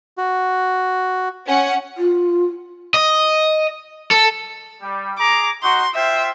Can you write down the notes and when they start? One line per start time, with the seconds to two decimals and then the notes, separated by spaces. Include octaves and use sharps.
0.18 F#4
1.46 C#4 F#5
1.98 F4
2.94 D#5
4.11 A4
4.82 G3
5.18 G#4 A#5 D6
5.63 D#4 F#4 C6
5.95 F4 C5 E5 G5